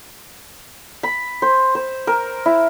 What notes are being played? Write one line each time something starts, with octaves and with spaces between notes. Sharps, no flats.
B5
C5
C5
A#4
E4